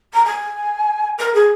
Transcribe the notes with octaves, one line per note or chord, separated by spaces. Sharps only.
A#5
G#5
A#4
G#4